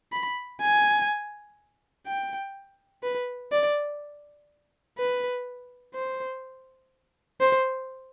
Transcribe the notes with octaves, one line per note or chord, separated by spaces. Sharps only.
B5
G#5
G5
B4
D5
B4
C5
C5